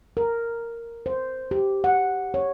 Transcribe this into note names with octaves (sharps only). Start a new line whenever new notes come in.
A#4
C5
G4
F#5
C#5